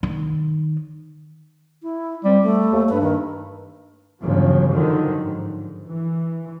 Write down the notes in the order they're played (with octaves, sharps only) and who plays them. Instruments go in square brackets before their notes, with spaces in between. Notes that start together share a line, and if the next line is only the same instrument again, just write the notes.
[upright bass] D#3
[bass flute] E4
[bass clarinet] G3 [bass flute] C4
[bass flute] A3
[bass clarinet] D#2
[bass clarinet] G2 [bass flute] B4
[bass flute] D#3
[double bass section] G1 E2 C#3 F3 F#3
F#2 D3 D#3 F3
G#2
E3